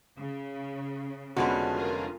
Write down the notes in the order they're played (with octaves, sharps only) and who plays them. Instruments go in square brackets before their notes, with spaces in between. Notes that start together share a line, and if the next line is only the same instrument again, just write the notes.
[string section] C#3
[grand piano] F1 G#3 C#4 [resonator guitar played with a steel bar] D3 F3 B3 [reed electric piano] F#4
[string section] F4 G#4 A#4